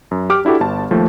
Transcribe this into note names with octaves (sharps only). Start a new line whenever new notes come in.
F#2
G4 D6 F6
D4 E4 F#4 G4 A4
G1 A5
D#2 F3 A3